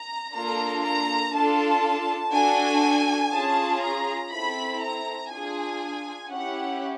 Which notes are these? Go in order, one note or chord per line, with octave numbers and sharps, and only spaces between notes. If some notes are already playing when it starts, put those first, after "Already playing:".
Already playing: A#5
A#3 D4 F4 A4 A#5
A#5
D4 F4 A4 A5
D4 F#4 A4 G#5
C#4 F4 G#4 A5
A#5
C4 E4 A4 B5
A#5
D4 F4 G#4 G#5
C#4 E4 G4 F#5